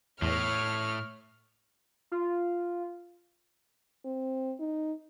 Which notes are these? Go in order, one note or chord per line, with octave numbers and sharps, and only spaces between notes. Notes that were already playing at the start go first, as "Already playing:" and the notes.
E2 A2 C#5 F6
F4
C4
D#4